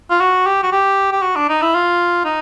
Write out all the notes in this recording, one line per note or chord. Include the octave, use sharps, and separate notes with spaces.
F4
F#4
G4
F#4
G4
G4
F#4
D4
D#4
E4
F4
D#4